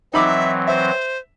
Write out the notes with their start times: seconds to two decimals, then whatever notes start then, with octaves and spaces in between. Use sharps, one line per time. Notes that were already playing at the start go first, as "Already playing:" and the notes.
0.13 E3 F#3 C4 D#4 E5 B5 D6
0.67 C5 E5